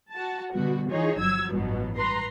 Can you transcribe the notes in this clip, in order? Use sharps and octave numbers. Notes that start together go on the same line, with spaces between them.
F#4 A5
B2 D3 G3 B3 F#4
E3 D#4 F4 G#4 C#5
G1 F3 F#3 E6 G#6
A1 G2 B2 F3 F#3
B4 A#5 C6